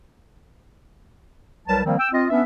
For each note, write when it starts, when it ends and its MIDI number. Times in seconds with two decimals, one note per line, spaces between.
1.68 1.80 36
1.68 1.80 54
1.68 1.80 55
1.68 1.80 70
1.68 1.80 71
1.68 1.80 81
1.85 1.97 51
1.85 1.97 53
1.85 1.97 55
1.85 1.97 58
1.85 1.97 60
1.98 2.08 79
1.98 2.08 88
2.12 2.25 60
2.12 2.25 65
2.12 2.25 75
2.30 2.43 59
2.30 2.43 61
2.30 2.43 62
2.30 2.43 71
2.30 2.43 76